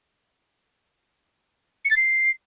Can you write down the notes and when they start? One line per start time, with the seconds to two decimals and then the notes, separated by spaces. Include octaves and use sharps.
1.85 C#7
1.91 A6
1.96 C7